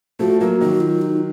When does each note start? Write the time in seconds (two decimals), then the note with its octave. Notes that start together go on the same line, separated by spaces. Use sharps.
0.19 F3 A3 F#4
0.41 F#3 A#3 F#4
0.61 D#3 F#3 F#4
0.81 F4
1.02 D#4